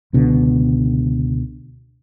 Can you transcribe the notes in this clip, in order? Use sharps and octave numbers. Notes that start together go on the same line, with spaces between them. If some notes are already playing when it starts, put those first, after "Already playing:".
C#2 B2 D3